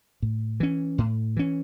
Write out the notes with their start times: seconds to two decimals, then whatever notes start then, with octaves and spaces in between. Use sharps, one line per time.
0.22 A2
0.60 E3 C#4
0.98 A2
1.37 E3 C#4